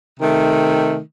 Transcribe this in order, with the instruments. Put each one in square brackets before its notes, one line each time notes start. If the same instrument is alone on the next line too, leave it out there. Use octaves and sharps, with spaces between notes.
[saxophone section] C3 D#3 A3